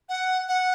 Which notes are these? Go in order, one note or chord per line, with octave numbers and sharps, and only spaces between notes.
F#5
F#5